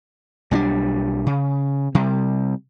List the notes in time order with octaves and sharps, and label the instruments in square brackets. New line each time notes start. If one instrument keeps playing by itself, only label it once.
[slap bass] B1 G3 C#4 D4
C#3
C3 G3